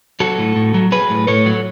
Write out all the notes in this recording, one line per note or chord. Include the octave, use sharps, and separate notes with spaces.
F#3 F#4 A4
A2
A2
F#3
F#3 G#4 B4
A2
A2 A4 C#5
F#3